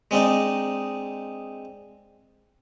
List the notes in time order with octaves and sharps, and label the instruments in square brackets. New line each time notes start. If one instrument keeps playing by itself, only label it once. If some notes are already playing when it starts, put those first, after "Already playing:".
[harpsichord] G#3 C4 D4 D#4